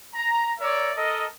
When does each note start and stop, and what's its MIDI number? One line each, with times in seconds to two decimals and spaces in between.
0.14 0.52 82
0.60 0.91 70
0.60 0.91 73
0.60 0.91 74
0.60 0.91 76
0.97 1.26 69
0.97 1.26 70
0.97 1.26 75